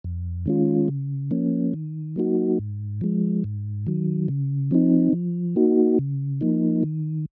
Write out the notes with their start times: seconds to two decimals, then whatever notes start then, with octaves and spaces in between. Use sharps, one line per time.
0.04 F2
0.46 D#3 G#3 C#4 F4
0.88 C#3
1.31 F3 A#3 C#4
1.74 D#3
2.16 F#3 A#3 D#4 F#4
2.59 G#2
3.01 F3 G#3
3.44 G#2
3.87 D#3 F#3
4.28 C#3
4.71 F3 C4 D#4
5.13 F3
5.56 A#3 D#4 F#4
5.99 C#3
6.41 F3 A#3 D#4
6.83 D#3